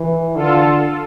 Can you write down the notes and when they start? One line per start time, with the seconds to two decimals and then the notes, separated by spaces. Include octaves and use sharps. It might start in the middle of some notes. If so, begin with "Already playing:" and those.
Already playing: E3
0.36 D3 F4 A4